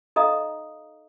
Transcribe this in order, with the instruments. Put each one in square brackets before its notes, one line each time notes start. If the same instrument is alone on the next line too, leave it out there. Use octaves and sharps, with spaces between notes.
[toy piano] D#4 A4 D#5 F5 A#5 D#6